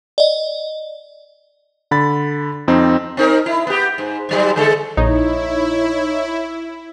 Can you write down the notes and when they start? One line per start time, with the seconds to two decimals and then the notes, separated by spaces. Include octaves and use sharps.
0.18 D5 D#5
1.91 D3 B5 A6
2.68 F2 C4 D#4
3.17 C4 D#4 A#4
3.46 E4
3.67 B3 G4
3.98 G#2
4.29 G#2 F#3 G3
4.56 D3 G#3 A4
4.97 A#1 D#4 E4 C#5